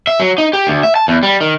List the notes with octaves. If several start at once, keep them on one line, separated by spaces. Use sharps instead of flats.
E5
F#3
D#4
G4
D2
E5
A5
E2
G3
D#3